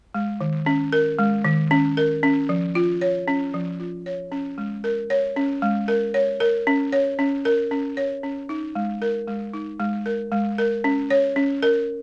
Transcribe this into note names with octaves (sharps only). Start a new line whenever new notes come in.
G#3
D#3
C#4
A#4
G#3
D#3
C#4
A#4
C#4
F3
F4
C#5
C#4
F3
F4
C#5
C#4
G#3
A#4
C#5
C#4
G#3
A#4
C#5
A#4
C#4
C#5
C#4
A#4
C#4
C#5
C#4
D#4
G#3
A#4
G#3
D#4
G#3
A#4
G#3
A#4
C#4
C#5
C#4
A#4